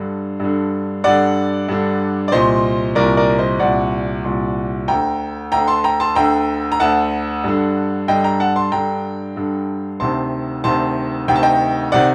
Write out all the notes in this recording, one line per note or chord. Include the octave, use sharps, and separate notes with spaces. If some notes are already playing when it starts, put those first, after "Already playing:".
Already playing: G2 D3
G2 D3
G2 D3 D5 F#5
G2 D3
D5
C2 A#2 C5 D#5
C2 A#2 A#4 D5
A#4 D5
C5 D#5
C2 A#2 D5 F#5
C2 A#2
D2 D3 G5 A#5
D2 D3 G5 A#5
A5 C6
G5 A#5
A5 C6
D2 D3 G5 A#5
A#5
D2 D3 F#5 A5
G2 D3
G2 D3 D#5 G5
G5 A#5
F#5 A5
A5 C6
G2 D3 G5 A#5
G2 D3
D2 C3 D#3 A5 C6
D2 C3 D#3 A5 C6
D2 C3 D#3 G5
A5
D#5 G5
C3 D#3 D5 F#5